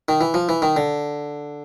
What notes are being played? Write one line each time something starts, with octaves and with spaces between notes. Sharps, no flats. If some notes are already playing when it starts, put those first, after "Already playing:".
D#3
E3
F3
E3
D#3
D3